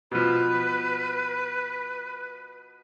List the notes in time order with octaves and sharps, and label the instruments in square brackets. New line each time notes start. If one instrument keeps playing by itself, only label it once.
[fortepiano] B2 F3 [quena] B4